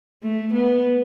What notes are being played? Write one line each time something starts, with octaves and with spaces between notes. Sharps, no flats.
A3
B3